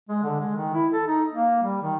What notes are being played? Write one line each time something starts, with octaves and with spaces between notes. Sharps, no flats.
G#3
D3
G#3
D#3
E4
A4
D#4
A#3
G3
D#3